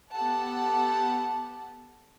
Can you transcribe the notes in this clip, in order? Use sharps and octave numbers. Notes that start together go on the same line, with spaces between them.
B3 G4 A4 F#5 A5